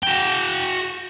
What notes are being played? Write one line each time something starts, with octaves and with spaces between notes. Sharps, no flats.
F#4 G5